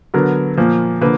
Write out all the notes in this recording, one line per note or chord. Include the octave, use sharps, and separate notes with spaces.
D3 F#3 B3 A#4
A#2 F3 A#3
D3 F3 A#3 B4